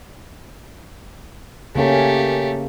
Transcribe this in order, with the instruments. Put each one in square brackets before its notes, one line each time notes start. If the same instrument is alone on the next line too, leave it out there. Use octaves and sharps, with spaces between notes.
[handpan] C#3 A#3 C#4 [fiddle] A3 G4